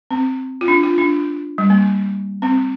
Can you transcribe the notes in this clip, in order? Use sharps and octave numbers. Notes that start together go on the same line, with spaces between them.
C4
F4
D4
F4
D4
G3
A#3
C4